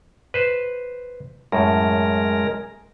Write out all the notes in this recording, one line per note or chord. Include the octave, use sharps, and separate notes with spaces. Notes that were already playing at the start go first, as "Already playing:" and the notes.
B4 C5
F#2 A2 G#3 A#4